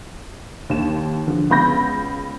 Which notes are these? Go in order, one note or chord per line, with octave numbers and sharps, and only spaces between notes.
D#2 D#3 E7
D3 F3
C#2 B3 B5 G6 A#6